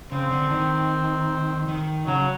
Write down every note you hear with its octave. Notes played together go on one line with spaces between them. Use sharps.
C#3 C4
D3
D#3
D#3
C#3 F#3